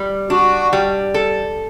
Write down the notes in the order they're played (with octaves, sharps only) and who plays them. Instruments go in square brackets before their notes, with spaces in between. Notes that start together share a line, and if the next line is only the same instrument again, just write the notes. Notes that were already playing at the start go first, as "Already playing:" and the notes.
Already playing: [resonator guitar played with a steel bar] G3
[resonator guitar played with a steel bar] D4 [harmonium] F#4
[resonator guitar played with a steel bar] G3
A4